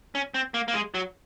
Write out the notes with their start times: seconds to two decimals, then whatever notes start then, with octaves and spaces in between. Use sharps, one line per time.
0.15 C#4
0.34 C4
0.54 A#3
0.68 A#3
0.74 G#3
0.94 F#3